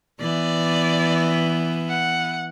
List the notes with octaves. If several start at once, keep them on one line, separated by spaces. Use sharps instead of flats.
E3 B3 D5
F#5